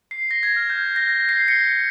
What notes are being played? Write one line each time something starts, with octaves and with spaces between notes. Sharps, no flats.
C7
A#6
G#6
F6
G6
A#6
A#6
C7
A#6 C#7